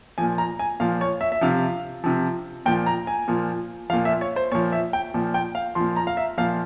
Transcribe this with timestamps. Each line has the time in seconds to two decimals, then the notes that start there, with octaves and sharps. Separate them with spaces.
0.18 A#2 F3 G#5
0.38 A#5
0.59 G#5
0.80 A#2 F3 F5
1.01 C#5
1.21 E5
1.32 E5
1.41 C3 F3 F5
2.04 C3 F3
2.66 A#2 F3 G5
2.86 A#5
3.07 G#5
3.28 A#2 F3
3.90 F3 F5
3.93 A#2
4.05 E5
4.21 C#5
4.36 C5
4.52 A#2 F3 C#5
4.72 E5
4.93 G5
5.14 A#2 F3
5.34 G5
5.55 F5
5.75 A#2 F3 C6
5.96 A#5
6.07 F5
6.17 E5
6.38 A#2 F3 F5